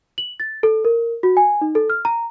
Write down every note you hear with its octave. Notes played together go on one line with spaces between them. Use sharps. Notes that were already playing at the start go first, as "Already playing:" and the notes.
F#7
A6
A4
A#4
F#4
G#5
D#4
A4
F6
A#5